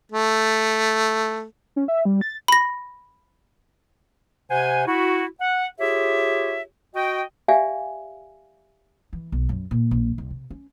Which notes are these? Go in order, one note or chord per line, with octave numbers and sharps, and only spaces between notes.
A3
C#4
E5
G3
A6
B5 A#6
C3 C5 F#5 G#5
E4 F#4
F#5
F4 G4 G#4 C#5 E5
F#4 D#5 G5
G4 D5 E5 F5 G#5
E3
B1
F#2
A#2
A#1
C2
C3
C#4